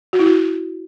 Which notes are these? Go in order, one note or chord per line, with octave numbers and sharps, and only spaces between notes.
F#4
E4
F#4